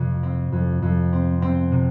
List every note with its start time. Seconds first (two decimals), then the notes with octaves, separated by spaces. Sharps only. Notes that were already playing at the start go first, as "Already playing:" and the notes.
Already playing: F2 C3
0.23 C4
0.52 F2
0.82 F2
1.13 C4
1.42 C4
1.72 C3